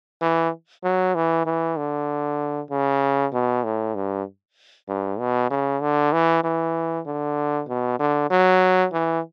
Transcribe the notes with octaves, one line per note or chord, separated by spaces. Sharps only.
E3
F#3
E3
E3
D3
C#3
B2
A2
G2
G2
B2
C#3
D3
E3
E3
D3
B2
D3
F#3
E3